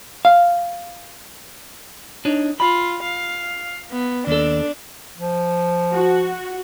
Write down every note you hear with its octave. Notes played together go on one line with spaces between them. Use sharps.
F5
D4 D#4 C#5
F4 B5
F5
B3
D#2 D4 A4
F3
F#4